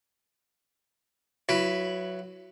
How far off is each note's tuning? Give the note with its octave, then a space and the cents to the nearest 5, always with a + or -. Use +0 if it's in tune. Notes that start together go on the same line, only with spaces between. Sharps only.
F#3 +0 E4 +30 B4 +0